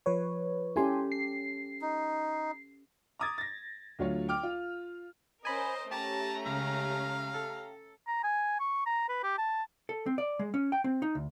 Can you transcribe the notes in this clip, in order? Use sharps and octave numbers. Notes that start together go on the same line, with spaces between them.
F3 B4 C#5
C#4 E4 G4 A4 G#5 C6
C7
D#4
A#5 D6 D#6 G#6 A6
A6 A#6
D2 F#3 F4 C#5 F5
G5 D6 F6
F4
C#4 A#4 C5 D#5 G#5 B5
A3 C#4 G4 A5 A#5
C#2 F5
A4
A#5
G#5
C#6
A#5
B4
G4
A5
A4
C4
D5
G#3
C#4
G5
C4
D#4
D2